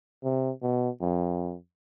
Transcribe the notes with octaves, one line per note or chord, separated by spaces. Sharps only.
C3
B2
F2